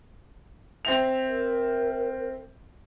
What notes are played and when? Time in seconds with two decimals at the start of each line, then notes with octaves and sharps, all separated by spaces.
0.85 C4 E5 F7
1.27 A#4